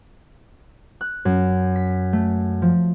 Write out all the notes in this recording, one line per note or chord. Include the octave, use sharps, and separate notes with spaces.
F#6
F#2
B6
A3
F3